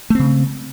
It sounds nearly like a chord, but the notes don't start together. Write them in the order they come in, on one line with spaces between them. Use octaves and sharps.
A3 C4 C#3